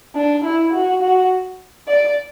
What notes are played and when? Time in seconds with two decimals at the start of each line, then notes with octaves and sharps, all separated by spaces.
0.15 D4
0.44 E4
0.73 F#4
1.02 F#4
1.88 D5